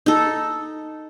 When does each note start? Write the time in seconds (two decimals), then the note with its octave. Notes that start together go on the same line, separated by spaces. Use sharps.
0.06 D#4 A4